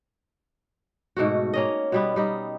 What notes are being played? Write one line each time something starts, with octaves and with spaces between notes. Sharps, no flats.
G#2 B2 A3 F#4
A#3 C#4 D#5
B2 G3 B3
G3 D#4